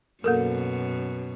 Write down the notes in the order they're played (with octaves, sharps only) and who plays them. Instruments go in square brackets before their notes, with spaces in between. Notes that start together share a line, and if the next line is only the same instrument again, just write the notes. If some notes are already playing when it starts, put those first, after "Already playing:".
[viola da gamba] F#2 B2 [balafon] A#3 A4 A#4